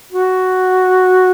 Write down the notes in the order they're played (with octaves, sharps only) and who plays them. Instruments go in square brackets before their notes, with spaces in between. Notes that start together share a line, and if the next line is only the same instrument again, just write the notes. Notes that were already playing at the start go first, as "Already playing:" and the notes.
[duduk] F#4